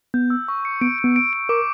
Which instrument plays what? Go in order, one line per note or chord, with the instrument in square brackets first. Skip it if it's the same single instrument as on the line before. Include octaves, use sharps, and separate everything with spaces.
[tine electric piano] B3 [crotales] G6
[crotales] E6
C#6
C#7
[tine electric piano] B3 [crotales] D7
[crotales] D7
[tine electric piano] B3
[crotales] D7
D7
[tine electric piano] A#4 [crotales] D6